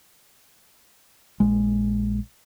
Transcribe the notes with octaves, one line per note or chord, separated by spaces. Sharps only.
A#1 G#3